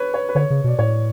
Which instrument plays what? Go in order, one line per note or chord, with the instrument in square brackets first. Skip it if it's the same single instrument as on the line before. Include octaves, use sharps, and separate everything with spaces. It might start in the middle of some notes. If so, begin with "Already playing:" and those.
Already playing: [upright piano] B4 C#5
C#5
B4
[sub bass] D3 [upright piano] C#5
[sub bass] C#3
[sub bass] B2 [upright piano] D5
[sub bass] A2 [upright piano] C#5